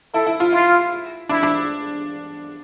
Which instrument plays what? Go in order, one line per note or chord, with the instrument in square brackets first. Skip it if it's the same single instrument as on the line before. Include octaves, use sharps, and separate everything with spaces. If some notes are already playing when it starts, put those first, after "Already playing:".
[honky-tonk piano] E4 [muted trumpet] A4
[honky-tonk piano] E4
F4
[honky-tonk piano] E4 [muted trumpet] F4
[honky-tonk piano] D4 [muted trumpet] E4
[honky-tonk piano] D4